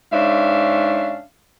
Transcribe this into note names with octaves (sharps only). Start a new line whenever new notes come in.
G#2 C#4 D4 E5 F5